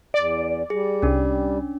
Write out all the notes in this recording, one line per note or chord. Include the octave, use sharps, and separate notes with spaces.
E2 D5 D7
G3 G#4
C2 C#4 D4